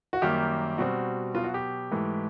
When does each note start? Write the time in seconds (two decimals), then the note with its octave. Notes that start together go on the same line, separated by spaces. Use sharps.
0.13 F#4
0.22 F#2 D#3 G3 A#3 G4
0.78 B2 G3 C4 F#4
1.34 B2 F#3 B3 F4
1.44 F#4
1.54 G4
1.91 G#2 E3 A3